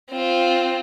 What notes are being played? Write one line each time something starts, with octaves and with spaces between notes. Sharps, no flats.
C4 F4